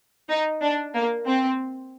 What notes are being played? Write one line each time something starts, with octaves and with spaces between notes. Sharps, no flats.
D#4
D4
A#3
C4